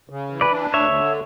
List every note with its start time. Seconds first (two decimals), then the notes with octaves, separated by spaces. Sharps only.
0.10 C#3
0.30 E3
0.41 B4 D5
0.52 D4
0.73 D2 C#5 E5
0.94 D3